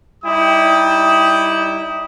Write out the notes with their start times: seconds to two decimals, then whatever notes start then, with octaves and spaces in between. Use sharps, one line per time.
0.24 G3 D#4 E4 D5 G5 D#6